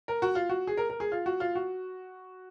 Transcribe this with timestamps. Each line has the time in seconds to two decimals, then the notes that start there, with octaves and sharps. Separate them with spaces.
0.08 A#4
0.22 F#4
0.35 F4
0.49 F#4
0.67 G#4
0.77 A#4
0.90 A#4
1.00 G#4
1.12 F4
1.26 F#4
1.40 F4
1.55 F#4